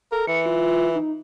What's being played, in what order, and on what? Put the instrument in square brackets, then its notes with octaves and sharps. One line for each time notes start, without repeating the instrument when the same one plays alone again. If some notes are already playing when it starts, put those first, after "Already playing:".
[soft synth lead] A4 [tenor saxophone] A#4
[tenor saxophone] E3 [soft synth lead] C#7
[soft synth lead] F4
D#4